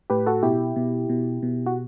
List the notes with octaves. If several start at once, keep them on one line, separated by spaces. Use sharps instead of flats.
A2 G4 B4
F#4 A4
B2 E4 G4
B2
B2
B2
F#4